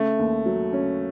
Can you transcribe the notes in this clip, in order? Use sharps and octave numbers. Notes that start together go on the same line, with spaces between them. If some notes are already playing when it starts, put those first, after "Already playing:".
Already playing: C#3 A3
D#2
F#3
C#4